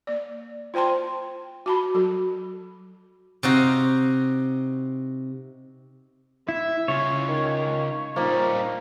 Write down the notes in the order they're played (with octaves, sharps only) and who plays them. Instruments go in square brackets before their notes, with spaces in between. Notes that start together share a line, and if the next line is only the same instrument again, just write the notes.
[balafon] A#3 D5
F4 C5 G5 A5 C6
F#4 A5 B5
F#3 F#4 A4
[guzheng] C3 D#4 F#4 F5
[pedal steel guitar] E4 [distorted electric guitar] E5
[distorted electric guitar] C#3 F4 [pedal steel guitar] C#5
[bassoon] D#3
[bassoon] F3 [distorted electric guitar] G3 D#4 [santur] A#3 A#4